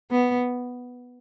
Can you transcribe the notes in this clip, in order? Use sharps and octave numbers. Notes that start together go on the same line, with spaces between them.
B3